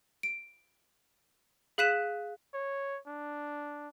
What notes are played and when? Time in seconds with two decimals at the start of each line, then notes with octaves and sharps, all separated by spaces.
0.23 D7
1.78 G#4 F5 F#6 B6 D#7 E7
2.54 C#5
3.07 D4